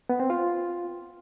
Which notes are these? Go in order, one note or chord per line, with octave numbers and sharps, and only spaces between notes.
B3
C4
F4